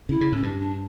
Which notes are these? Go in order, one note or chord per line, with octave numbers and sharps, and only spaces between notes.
C#3 E4
C#3
A2 C#4
G2 D4
D4